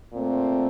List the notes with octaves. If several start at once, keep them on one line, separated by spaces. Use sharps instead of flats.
A#2 A3 C4